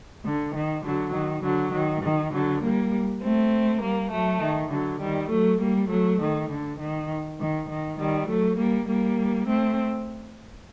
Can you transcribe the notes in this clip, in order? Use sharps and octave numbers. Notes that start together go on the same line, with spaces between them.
D3
D#3
D3 F#3
D#3
D3 F#3
D#3
D#3
D3 F#3
G3 A#3
A3 C4
G3 A#3
F#3 A3
D#3
D3 F#3
D#3 G3
F#3 A3
G3 A#3
F#3 A3
D#3
D3
D#3
D#3
D#3
D#3 G3
F#3 A3
G3 A#3
G3 A#3
A3 C4